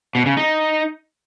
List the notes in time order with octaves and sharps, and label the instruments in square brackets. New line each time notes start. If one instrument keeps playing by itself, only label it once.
[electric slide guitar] B2
C#3
D#4